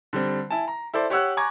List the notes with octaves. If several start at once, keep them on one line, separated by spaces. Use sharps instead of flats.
D3 G3 C4
E4 G#5 A5
A#5
E4 A4 C5 D5
G4 C#5 F#5 E6 F#6
G#5 A#5 C#6 D6 G#6